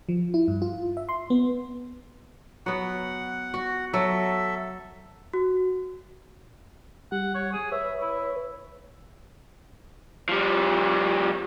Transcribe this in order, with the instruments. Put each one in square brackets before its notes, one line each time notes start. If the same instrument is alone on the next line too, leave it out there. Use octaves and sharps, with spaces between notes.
[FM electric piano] F3
E4
G2
F4
E5
C6
B3
[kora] F#3 B3 [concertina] F#5
[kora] F#4
[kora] F#3 [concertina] A4 E5
[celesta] F#4
[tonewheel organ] G3 [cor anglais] F#5
[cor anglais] C#5
G#4
[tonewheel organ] B4 C#5 [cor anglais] E5
[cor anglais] E4
[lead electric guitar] F3 G3